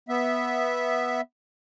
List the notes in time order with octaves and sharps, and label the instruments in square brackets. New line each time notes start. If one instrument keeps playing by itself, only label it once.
[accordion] B3 E5